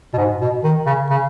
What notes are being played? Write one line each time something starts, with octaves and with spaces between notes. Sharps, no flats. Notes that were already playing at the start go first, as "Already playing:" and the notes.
B2
G#2
B2
D#3
C#3
C#3